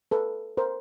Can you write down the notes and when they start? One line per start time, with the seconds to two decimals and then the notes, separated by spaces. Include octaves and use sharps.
0.11 A4 B4
0.57 A#4 C5